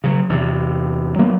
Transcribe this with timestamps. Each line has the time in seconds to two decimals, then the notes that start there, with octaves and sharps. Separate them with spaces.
0.04 C#3 F#3
0.29 E2 C3
1.19 F#3 A#3 B3